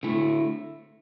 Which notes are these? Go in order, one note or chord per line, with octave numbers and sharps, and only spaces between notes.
D3 A3 E4